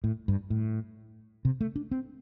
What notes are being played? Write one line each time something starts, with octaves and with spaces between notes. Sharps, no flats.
A2
G2
A2
C3
A3
D4
C4